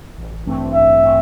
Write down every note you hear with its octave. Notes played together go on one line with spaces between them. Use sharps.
A1
G2 E3 A3 C4
A1 E5
E3 A3 C4